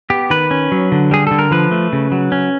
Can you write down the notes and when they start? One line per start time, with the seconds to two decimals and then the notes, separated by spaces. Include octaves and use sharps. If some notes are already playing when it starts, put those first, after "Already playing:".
0.10 B3 G4
0.30 D#3 B4
0.51 C#4
0.72 F#3
0.92 D3
1.11 G3 G#4
1.27 D3 A4
1.39 A#4
1.51 F3 B4
1.71 A3
1.93 C#3
2.12 F#3
2.32 C#4